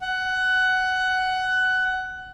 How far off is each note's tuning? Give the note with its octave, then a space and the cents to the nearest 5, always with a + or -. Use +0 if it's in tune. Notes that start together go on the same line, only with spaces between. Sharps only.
F#5 +15